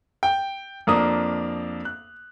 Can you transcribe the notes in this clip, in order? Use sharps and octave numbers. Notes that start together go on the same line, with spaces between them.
G5
F2 A#3 D4 D#6
F#6